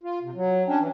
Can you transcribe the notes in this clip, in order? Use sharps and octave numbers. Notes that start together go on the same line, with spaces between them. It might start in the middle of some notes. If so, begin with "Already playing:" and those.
F4
C3
F#3
C#4 D4 G5
E3